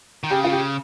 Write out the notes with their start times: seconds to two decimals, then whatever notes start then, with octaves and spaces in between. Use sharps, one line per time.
0.24 D#3
0.31 C#3 G4
0.44 F4
0.52 G4